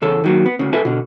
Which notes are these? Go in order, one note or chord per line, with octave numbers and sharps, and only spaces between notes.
E2 C#3 A4 C#5
D#3 F#3 A#3
B3
D2 C#3
F4 A4 B4 E5 G#5
B2 D3